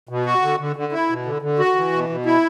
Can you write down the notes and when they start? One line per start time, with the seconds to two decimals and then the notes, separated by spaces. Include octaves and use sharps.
0.09 B2
0.26 F#4
0.42 D3
0.59 D3
0.76 D3
0.92 E4
1.09 B2
1.25 D3
1.42 D3
1.59 F#4
1.76 E3
1.93 B2
2.09 B2
2.26 E4